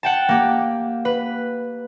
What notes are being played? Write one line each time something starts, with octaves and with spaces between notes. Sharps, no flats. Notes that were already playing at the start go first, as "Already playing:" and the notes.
F#5 G5 A5
A#3 G4
B4